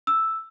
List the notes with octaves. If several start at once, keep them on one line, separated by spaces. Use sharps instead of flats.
E6